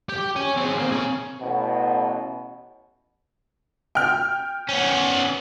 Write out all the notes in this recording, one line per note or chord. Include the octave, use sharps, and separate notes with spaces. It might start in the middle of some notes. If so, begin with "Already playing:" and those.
G4 G5
C#5 G#5
C4 G#4
A#3 C4
C#4 G#4
A1 B2
G5 F6
B3 C#4